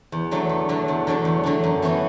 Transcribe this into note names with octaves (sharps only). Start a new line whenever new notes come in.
E2
D3 F#3 A3 D4
E2
D3 F#3 A3 D4
E2
D3 F#3 A3 D4
E2
D3 F#3 A3 D4
F#2
E3 B3 F#4 C#5